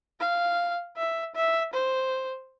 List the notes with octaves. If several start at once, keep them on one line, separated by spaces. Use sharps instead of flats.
F5
E5
E5
C5